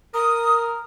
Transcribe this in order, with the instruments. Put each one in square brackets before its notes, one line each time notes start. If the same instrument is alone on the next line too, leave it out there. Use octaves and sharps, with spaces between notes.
[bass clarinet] A#4 [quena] D#6